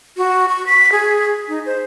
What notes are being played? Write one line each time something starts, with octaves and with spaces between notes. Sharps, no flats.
F#4
C#6
B6
G#4
D#4
C5